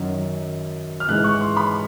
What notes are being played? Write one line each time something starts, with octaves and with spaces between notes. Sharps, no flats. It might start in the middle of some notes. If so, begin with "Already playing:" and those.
Already playing: F#2 D#3 F#3
F6
G#2 E3 G#3 F#6
C#6
C6
B5